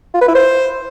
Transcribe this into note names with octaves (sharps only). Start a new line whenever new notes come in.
F4
B4
E4
C5